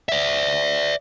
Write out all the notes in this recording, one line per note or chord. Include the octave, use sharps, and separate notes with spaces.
D5 E5